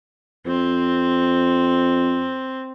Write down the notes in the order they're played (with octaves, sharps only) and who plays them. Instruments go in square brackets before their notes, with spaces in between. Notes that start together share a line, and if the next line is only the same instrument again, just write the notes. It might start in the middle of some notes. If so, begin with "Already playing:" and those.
[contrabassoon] F2 [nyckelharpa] C4